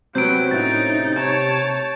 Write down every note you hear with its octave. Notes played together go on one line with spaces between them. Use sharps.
C3 F#3 B3 C4 G6 D7
A2 C#4 D#4 E5 A6
C#5 A5 A#5